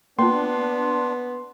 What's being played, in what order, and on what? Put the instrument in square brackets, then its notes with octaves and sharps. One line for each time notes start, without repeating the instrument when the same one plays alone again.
[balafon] A#3 F4 [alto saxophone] B3 [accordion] D4 [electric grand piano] C6